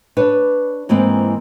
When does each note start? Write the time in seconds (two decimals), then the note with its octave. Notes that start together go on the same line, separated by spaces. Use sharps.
0.17 D4 B4 C#5
0.89 G#2 E3 A#3 C4